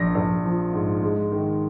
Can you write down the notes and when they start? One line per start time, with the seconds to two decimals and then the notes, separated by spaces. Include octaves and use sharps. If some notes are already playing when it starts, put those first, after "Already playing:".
Already playing: A#1 A#6
0.15 A#1
0.44 F3
0.73 G#2
1.02 G#3
1.32 D#3